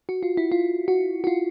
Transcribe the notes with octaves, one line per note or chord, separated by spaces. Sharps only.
F#4
F4
E4
F4
F#4
F#4
F4